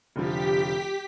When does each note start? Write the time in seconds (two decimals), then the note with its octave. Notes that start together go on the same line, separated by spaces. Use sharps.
0.16 F1 D3 F3 G4 B6